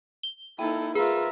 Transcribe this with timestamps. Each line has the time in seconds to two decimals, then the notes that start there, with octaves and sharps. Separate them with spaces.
0.23 G7
0.59 A#3 D#4 E4 A4 G5
0.95 F4 G#4 A#4 B4 E5